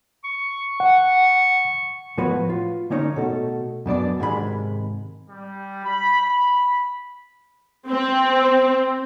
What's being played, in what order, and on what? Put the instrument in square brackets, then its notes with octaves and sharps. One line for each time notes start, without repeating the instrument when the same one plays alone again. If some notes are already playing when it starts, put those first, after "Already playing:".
[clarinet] C#6
[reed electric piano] F#5
[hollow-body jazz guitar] A2 F3 B3 F#4 B4 C#5
F4
D3 A#3 C#4 D#4 C#5
B2 A3 A4
F#2 B2 D4 D5
G#2 C3 D#3 G#3 B4 B5
[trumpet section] G3
B5
B5
[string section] C4